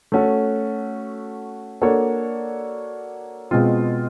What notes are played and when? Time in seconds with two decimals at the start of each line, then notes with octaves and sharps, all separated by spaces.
0.12 A3 C#4 F#4 A4
1.81 A#3 D4 F#4 A4 C#5
3.51 B2 G#3 C4 F4